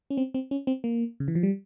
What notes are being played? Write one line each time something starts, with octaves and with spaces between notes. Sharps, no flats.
C#4
C4
C4
C#4
C4
A#3
C#3
E3
F3
G3